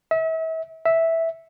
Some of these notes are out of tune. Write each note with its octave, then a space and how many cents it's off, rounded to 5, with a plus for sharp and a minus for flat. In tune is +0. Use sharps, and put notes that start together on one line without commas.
E5 -35
E5 -5